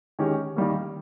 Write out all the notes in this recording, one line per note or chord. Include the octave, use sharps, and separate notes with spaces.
D#3 G#3 C#4 G4
D#3 G3 A#3